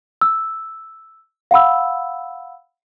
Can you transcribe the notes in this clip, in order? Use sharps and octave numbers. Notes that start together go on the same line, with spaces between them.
E6
F5 F#5 B5 E6